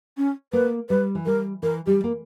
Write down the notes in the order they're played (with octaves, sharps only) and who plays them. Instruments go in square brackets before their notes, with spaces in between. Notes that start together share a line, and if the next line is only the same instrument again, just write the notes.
[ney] C#4
[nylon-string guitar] A#3 [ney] B4
[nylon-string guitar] G3 [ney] B4
[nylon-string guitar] E3
[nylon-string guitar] G3 [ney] A#4
[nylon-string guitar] E3 [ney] A#4
[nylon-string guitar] G3 [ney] G4
[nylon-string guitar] A#3